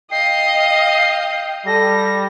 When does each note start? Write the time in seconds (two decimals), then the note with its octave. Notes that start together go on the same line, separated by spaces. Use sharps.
0.11 D#5 F5 G5 C7
1.66 G3 A4 A#6